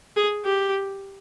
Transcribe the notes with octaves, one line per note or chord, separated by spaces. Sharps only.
G#4
G4